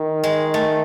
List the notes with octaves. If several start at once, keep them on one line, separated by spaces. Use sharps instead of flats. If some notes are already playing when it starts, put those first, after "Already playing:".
Already playing: D#3
G#3
A3